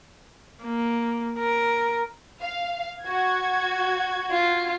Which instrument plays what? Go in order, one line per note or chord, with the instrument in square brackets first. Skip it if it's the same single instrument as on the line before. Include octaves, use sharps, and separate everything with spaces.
[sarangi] A#3
A#4
[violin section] F5
F#4 G#6
[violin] F4